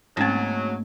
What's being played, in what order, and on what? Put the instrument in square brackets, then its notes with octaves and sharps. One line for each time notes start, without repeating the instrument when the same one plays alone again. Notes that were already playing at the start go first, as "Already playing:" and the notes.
[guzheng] G#2 A5 [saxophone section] C#3 F#3 [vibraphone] A3 A#3 [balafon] C4 C#4